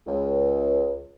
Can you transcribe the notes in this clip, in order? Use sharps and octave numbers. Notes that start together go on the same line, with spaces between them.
C#2